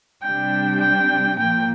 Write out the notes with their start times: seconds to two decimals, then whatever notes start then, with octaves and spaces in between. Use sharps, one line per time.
0.22 C3 G3 D4 G5
0.80 G5
1.38 A#2 F3 A#3 G5